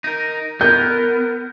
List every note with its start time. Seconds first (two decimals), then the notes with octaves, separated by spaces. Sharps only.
0.04 D#4 A#4
0.61 B3 A#4 G6